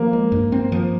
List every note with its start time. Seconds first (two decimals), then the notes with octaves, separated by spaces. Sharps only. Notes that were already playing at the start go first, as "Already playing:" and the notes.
Already playing: F3 A#3
0.13 G#3
0.32 G2
0.52 C4
0.72 F3